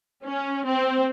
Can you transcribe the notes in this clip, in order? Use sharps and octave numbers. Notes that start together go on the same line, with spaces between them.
C#4
C4